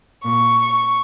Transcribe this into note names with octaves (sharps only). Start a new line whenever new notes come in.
A#2 C#6